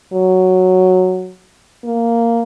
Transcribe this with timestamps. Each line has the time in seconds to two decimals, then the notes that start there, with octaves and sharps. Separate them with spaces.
0.13 F#3
1.84 A#3